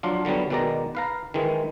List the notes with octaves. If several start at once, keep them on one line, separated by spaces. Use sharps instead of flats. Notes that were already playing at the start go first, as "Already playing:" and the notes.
F3 F#3 D4 F4
D3 F#3 G3 B3
B2 D#3 G#3 D5 A#5
B4 F5 A#5
D#3 E3 G#3